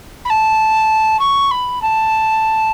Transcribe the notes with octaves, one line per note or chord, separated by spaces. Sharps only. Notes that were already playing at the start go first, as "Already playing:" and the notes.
B5
A5
C#6
B5
A5